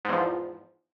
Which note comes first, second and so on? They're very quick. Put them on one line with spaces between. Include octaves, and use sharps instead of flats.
G#2 E2 F3